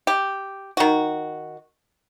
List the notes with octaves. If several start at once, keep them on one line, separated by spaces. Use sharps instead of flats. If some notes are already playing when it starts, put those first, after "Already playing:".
G4
D#3 F#4